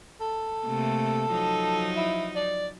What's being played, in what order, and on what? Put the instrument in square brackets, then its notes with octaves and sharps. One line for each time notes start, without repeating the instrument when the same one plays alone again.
[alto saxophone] A4
[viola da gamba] C3 A3 A#3
F3 F#3 D#4
[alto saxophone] E4
D5